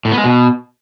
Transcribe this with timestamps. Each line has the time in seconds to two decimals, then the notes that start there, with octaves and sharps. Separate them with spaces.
0.05 A2
0.11 B3
0.18 G#3
0.24 B2